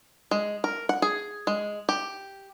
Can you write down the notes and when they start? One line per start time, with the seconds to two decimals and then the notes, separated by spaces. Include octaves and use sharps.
0.31 G#3
0.64 A#4
0.89 F#5
1.02 G#4
1.47 G#3
1.89 G4